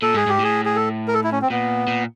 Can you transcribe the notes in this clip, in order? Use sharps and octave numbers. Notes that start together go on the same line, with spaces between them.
A#2 A4
G#2 G#4
G#2 G4
A2
G#4
G#4
A4
A#4
A4
E4
C#4
C4
A#2 B3
A#2